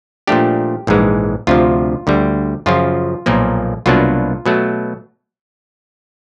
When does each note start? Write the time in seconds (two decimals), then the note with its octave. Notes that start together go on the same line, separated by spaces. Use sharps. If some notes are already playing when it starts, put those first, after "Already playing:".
0.27 A#2 F3 A3 D4 G4
0.87 A#1 G#2 E3 G#3
1.47 D2 C3 F3 F4
2.07 D2 D3 G3
2.66 F#2 C#3 F3 F4
3.26 B1 A#2 F3 A#3
3.86 C2 B2 F#3 A#3 D4 F4
4.46 B2 F#3 A3